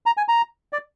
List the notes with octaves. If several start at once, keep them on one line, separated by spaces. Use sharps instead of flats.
A#5
G#5
A#5
D5